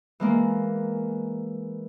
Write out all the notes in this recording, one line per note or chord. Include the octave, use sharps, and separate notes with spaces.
E3 G#3 A#3